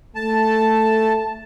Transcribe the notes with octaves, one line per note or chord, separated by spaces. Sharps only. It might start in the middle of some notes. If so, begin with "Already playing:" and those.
A3 A5